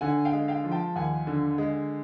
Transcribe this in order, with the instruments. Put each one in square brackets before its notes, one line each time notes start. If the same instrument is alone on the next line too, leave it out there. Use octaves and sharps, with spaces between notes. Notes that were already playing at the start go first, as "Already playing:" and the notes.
[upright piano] D3 F#5 G#5
F5 G5
G#3
F5 G5
F3
G5 A5
D#2 F#5 G#5
D3
G#3